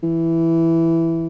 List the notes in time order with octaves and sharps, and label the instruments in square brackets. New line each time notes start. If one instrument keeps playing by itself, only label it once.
[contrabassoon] E3